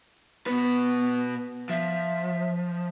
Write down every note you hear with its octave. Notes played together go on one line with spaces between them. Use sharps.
B2 B3 B4
F3 E5